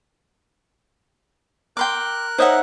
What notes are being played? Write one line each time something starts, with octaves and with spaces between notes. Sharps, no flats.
A#4 G5 C6 D6 F#6
D#4 C5 C#5 E5 F#5 D#6